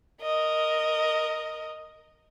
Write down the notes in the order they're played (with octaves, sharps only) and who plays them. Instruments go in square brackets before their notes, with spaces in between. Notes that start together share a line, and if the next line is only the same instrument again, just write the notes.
[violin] A#4 D#5